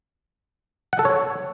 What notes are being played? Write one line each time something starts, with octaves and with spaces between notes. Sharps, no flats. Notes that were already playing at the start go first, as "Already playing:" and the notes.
F#5
A4
C#5